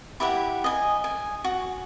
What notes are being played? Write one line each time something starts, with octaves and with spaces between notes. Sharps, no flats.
E4 G4 E5 F#5
D#5 G#5
G#5
F#4